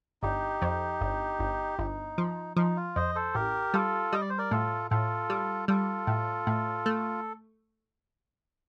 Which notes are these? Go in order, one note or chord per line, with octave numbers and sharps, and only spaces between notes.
G1 D#4 G4
F2
G1
G1
G1 D#4
F3
F3 D#4
F4
F2 C5 D#5
A4 C5
A1 G4 A#4
G3 F4 A4
G3 D#5
D5
C5
A#4 D5
A2 F4 A4
A2 F4 A4
G3
G3 F4 A4
A2
A2
A3